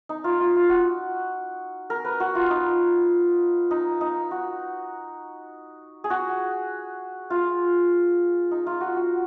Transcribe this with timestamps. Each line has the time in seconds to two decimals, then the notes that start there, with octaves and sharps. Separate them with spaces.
0.09 D#4
0.24 F4
0.40 F4
0.56 F4
0.69 F#4
1.90 A#4
2.05 B4
2.20 F#4
2.35 F4
2.50 D#4
3.71 D#4
4.01 D#4
4.31 F#4
6.04 G#4
6.10 F#4
7.30 F4
8.51 D#4
8.67 F4
8.81 F#4
8.96 F#4